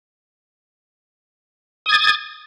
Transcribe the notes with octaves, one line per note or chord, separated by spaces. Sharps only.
D#6 G#6 A6